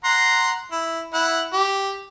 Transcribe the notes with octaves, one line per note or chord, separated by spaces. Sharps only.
F#5 A#5 C6
E4
E4 F#5
G4